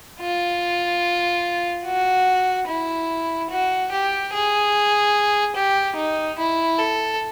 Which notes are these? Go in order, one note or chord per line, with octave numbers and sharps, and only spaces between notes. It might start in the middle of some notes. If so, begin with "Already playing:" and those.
F4
F#4
E4
F#4
G4
G#4
G4
D#4
E4
A4